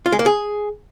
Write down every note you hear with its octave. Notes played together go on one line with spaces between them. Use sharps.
F4
G#3
A#3
G#4